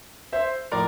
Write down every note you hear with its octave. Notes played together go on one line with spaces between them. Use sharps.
C5 E5
A2 F3 A#4 D5